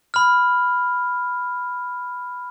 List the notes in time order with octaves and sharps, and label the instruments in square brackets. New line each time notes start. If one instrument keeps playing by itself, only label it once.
[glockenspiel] B5 F6